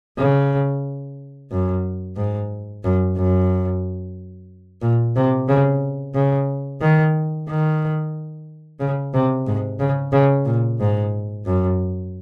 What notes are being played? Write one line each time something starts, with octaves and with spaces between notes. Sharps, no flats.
C#3
F#2
G#2
F#2
F#2
A#2
C3
C#3
C#3
D#3
D#3
C#3
C3
G#2
C#3
C#3
A#2
G#2
F#2